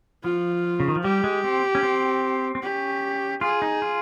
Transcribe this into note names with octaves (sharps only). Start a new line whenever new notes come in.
F3 F4
C#3
D#3
F3
G3 G4
G#3
C4
C#4
C4
C4
C#4 G4
F4 G#4
D#4
F4